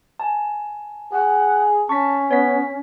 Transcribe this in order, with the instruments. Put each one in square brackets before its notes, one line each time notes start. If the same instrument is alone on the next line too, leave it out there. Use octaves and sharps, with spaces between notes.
[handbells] G#5 A5
[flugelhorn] G#4 [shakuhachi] F#5
[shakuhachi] C#4 [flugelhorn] A5 [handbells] C#6 B6
[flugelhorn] B3 [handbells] C#5 B6